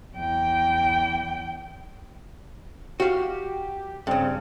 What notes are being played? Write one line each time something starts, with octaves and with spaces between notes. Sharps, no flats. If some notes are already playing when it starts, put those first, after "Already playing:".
E2 G5
F#4 G4 F5
G2 C#3 C4